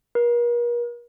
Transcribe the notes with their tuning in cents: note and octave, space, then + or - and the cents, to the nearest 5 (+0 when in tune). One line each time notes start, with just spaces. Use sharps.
A#4 +40